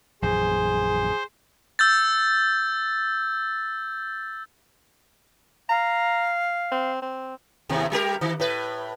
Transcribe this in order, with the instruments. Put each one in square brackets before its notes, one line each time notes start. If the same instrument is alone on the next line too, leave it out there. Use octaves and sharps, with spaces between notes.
[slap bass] A#1 F#2 E3 [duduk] G#4 [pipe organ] C5
[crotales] E6 G6 A6
[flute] F5 [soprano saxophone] A#5
[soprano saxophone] C4
C4
[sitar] D#2 A2 C3
G3 G4 A#4
D#3
A2 B4